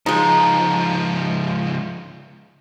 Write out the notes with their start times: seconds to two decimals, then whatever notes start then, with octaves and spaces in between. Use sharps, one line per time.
0.06 C#2 F3 G#3 D#4